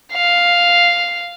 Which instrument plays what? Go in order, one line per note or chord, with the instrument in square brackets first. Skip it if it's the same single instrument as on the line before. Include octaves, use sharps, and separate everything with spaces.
[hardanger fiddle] F5